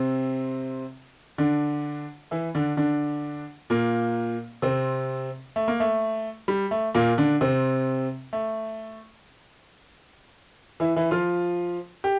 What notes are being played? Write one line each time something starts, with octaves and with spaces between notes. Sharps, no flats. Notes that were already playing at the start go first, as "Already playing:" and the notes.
Already playing: C3 C4
D3 D4
E3 E4
D3 D4
D3 D4
A#2 A#3
C3 C4
A3
A#3
A3
G3
A3
A#2 A#3
D3 D4
C3 C4
A3
E3 E4
E3 E4
F3 F4
G4